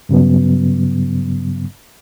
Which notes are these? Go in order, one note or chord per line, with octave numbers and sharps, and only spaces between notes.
G2 C#3 F#3 B3